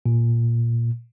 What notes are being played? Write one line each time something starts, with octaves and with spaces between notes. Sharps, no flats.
A#2